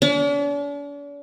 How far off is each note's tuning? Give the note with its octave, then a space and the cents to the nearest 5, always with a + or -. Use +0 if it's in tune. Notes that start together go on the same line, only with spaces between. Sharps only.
D4 -45